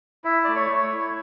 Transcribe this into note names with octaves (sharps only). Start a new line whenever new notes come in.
E4 E5
A3 D5
C#5
A3
E4